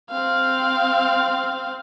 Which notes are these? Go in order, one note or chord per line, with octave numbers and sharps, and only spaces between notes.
C4 F5